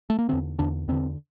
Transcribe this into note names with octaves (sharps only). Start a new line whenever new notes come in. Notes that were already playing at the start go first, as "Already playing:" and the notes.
A3
A#3
E2 D3 C4
E2 D3 D4
E2 D3 C4